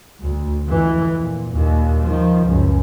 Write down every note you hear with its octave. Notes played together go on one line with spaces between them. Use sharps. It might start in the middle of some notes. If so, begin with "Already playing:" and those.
D2
F2 E3
A#2
D#2 A#2
D#3 F3
C#2 F#2